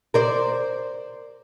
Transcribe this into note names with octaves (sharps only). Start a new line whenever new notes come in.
A#4 C5 D5